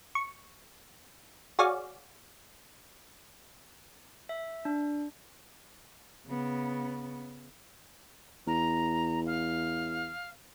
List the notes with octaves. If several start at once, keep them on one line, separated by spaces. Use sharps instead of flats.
C#6
F#4 G#4 C#5 D5 F5
E5
D4
C#3 B3
E2 A#5
F5